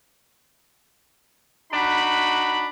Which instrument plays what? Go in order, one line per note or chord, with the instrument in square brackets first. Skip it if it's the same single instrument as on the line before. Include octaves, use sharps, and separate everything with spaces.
[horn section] D4 D#4 F#4 B5